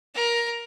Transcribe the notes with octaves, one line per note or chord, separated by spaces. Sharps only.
A#4